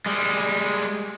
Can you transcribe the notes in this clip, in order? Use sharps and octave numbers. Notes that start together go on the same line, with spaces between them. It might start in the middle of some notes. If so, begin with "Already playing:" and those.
G3 G#3